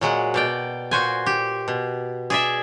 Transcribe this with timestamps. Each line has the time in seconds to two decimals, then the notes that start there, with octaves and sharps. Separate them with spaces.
0.01 A#2 F#3 G#3 F#5
0.34 B2 D5 G5
0.91 A#2 F#4 C5 G#5
1.26 G4
1.68 B2
2.30 G#4 D5 E5